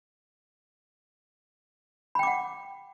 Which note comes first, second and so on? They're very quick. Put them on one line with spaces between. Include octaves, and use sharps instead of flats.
B5 G5 D6 F#5